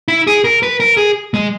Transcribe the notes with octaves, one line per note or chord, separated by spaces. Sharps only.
E4
G#4
A#4
B4
A#4
G#4
G#3